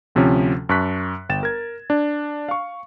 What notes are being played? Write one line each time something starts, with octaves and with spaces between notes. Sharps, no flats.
D2 C3 F3 C#4
F#2 A5 C#6 F#6 B6
G1 G5 A6 E7
A#4 G#6
D4
F5 C#6